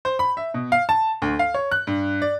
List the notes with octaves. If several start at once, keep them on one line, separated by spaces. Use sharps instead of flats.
C5
B5
E5
B2
F5
A5
D2
F5
C#5
F#6
G2
D5